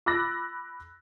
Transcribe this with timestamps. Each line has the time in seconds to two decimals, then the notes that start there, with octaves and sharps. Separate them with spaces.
0.06 B5 D6 E6 F#6 A6 A#6